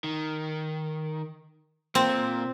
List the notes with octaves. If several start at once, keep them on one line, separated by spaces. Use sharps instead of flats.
D#3
A#2 C4